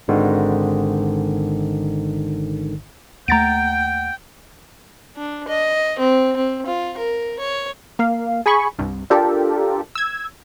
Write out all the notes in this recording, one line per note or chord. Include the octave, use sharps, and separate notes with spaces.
G#1 G#2 D3 D#3
D#2 A3 F#5 G5 A#5 A6 D7
D4
D#5
C4
C4
F4
A#4
C#5
A#3 F5
G#4 G#5 B5 C#6
C2 G2
D4 F4 G4 A4 A#4
E6 G#6